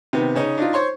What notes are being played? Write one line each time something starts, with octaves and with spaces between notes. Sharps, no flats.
C3 D#3 B3
C#3 C#4 D#4
D4 D#4 F4
C5 C#5 C6 C#6